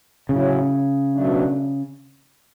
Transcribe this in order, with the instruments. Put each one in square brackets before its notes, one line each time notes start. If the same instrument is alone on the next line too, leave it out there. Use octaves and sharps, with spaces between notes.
[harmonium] A2 F#3 C#4 E4 [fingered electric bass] C#3
[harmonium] B2 F#3 A3 D4